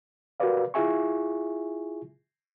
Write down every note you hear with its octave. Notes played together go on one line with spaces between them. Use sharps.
F#4 G4 A#4 B4 D5 F5
E4 F4 G#4 E5 G#5 C#6